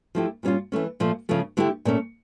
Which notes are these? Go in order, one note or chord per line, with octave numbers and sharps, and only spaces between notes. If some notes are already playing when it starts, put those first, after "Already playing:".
F3 A3 E4 G4
A#2 G3 C#4 F4
E3 A3 C#4
A#2 F3 A3
C#3 F3 A3
D3 A3 E4 G4
A#2 A3 C#4